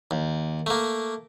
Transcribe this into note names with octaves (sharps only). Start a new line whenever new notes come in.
D#2
A3 A#3